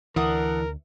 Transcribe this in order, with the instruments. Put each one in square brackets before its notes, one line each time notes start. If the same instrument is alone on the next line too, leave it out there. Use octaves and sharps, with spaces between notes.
[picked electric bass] D2 [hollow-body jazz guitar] E3 [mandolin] D4 F#5 D#6 [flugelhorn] A#4